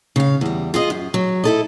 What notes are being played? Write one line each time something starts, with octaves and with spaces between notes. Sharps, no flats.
C#3 F5
E2 G3
F4 G#4 D#5
F#2
F#3
E4 A4 D#5